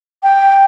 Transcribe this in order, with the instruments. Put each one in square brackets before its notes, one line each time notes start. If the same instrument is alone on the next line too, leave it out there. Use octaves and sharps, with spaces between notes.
[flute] G5